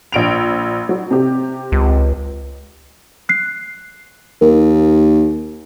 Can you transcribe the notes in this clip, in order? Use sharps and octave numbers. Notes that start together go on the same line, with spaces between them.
A#1 D7 F7
F#3
C3 G4
C#2
F#6 C7
D#2 A#4